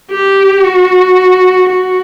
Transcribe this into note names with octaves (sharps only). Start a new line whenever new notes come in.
G4
F#4
F#4